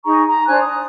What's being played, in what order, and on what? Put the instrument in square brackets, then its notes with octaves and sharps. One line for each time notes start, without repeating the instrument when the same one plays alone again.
[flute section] D#4 G#4 A#5 C#6
A#5
D4 C5 G#5 F#6
D#6